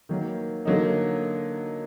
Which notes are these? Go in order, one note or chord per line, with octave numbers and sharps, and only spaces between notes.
D#3 F#3 A#3
D3 F#3 A#3 D#4